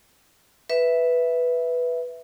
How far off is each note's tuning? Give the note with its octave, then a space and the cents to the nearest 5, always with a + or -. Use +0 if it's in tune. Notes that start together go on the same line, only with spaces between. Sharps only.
B4 +0 E5 +0